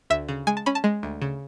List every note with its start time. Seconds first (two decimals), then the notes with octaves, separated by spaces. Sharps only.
0.10 D2 E5
0.29 C#3
0.47 G#3 G#5
0.57 A5
0.66 C#4 B5
0.75 A5
0.84 G#3
1.03 D2
1.22 C#3